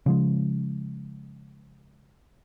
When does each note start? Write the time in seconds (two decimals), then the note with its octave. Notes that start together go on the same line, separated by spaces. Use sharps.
0.06 C#3 F3 G#3